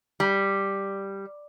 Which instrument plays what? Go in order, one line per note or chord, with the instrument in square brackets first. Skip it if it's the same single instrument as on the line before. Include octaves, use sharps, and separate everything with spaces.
[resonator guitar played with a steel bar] G3